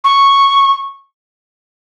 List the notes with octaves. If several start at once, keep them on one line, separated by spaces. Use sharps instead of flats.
C#6